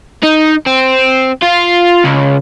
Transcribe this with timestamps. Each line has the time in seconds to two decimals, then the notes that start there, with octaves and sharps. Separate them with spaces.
0.23 D#4
0.67 C4
1.42 F4
2.05 C#2